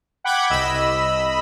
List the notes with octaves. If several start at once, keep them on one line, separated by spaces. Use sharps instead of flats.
F#5 G5 B5 D6 F#6 G#6
C2 D#5 B5 E6